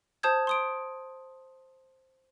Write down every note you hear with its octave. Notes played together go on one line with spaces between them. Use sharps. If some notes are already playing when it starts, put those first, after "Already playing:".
C5 A5 D#6 G6 G#6
C6 D#6 D7